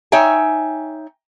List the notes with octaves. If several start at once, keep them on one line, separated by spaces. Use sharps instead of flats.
D#4 C#5 E5 G5 G#5